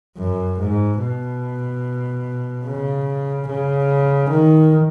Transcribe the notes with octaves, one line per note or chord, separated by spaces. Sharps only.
F#2
G#2
B2
C#3
C#3
D#3